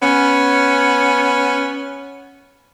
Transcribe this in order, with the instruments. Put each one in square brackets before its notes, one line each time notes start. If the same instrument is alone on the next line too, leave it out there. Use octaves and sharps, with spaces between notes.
[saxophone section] B3 C#4